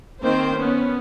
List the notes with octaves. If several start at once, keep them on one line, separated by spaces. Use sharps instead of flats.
D#3 A#3 C4 C5
B3 C#4